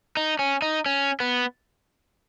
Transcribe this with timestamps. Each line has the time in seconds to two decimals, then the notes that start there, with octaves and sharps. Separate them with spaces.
0.17 D#4
0.39 C#4
0.62 D#4
0.86 C#4
1.20 B3